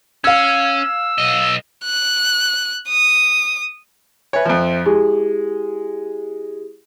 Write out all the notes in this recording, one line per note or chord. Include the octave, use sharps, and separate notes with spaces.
C#4 F5 E6 G#6
B1 D#5
F#6
D#6
B4 C#5 E5 G#5
F2 F3 C5 E5
G#3 E4 G4 G#4